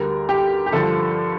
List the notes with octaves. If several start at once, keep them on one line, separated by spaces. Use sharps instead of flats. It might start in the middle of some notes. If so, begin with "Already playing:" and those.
Already playing: D2 D3 G3 A#4
G4
G4
G2 D3 F3 A4